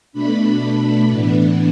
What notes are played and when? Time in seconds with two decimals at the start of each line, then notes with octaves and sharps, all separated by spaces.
0.13 B2 A3 D4 B5
1.10 A2 E3 B3 D4